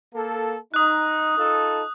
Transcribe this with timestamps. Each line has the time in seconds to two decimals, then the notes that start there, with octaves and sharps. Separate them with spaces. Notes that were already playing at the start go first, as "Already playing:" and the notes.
0.14 A#3 A4
0.74 D#4 D#6 F#6
1.38 D#4 F4 A4